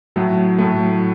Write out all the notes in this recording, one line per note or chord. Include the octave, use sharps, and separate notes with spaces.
A2 F#3 A3
A2 F#3 A3